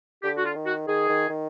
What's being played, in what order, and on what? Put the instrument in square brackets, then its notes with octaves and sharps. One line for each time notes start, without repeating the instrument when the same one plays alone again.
[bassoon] D3 [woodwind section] G4
[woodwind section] F#4
F4
[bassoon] D#3
[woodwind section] F#4
[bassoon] D#3 [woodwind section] G#4
[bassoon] D#3
D#3